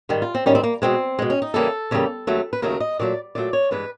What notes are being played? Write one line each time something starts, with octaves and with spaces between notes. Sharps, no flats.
G#2 D#3 G3
F4
C4
G#2 D#3 G3 C#4
C4
A#3
B2 G#3 C4
B2 G#3
C#4
D#4
E2 C#3 E3 G3 A#3 A4
E2 C#3 E3 G3 A#3
D#2 C#3 F#3 A3
B4
D#2 C#3 F#3 A3 A#4
D#5
A#2 F#3 A3 D5
A#2 F#3 A3 D5
C#5
G2 E3 G#3 B4